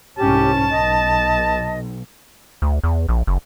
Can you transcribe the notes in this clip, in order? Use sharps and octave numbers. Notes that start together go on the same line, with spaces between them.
C2 G#2 C#4 G4 A5
B1 D#5
D2
E2
A#1
F#1